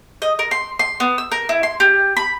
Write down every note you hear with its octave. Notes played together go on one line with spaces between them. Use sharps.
D#5
A#4
C6
C6
B3
E6
A#4
E4
C6
G4
B5